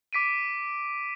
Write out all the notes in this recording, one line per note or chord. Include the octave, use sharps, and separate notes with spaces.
D6 B6 D7 D#7